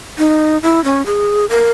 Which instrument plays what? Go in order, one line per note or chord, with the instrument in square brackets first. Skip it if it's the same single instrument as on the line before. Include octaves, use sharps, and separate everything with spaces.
[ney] D#4
E4
C#4
G#4
A#4